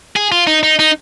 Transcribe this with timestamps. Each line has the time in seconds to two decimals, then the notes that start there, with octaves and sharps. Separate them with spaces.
0.16 G#4
0.32 F4
0.47 D#4
0.63 D#4
0.79 D#4